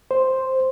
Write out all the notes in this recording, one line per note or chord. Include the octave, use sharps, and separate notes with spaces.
C5